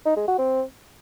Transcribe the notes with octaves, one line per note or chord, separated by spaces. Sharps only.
D#4
G#3
F#4
C4